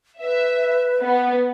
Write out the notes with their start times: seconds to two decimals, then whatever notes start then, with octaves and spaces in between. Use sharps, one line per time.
0.21 B4 E5
1.01 B3